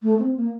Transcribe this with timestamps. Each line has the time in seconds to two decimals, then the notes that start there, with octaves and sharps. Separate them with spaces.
0.03 A3
0.19 C4
0.37 A#3